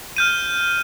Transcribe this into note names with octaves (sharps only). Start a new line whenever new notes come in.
F6 G6 D#7